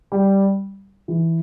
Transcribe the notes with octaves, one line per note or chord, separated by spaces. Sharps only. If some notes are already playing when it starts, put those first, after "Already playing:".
G3
E3